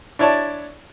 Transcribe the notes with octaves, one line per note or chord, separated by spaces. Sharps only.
D4 E4 C#5 D5 A5